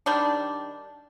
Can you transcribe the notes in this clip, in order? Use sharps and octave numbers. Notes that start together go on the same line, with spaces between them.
D#3 G3 D4